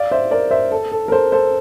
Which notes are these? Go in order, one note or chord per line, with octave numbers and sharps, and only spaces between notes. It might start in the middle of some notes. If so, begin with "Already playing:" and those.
Already playing: D5 F5
C5 E5
A#4 D5
C5 E5
A4
A4
A#4
A4 C5
A4 C5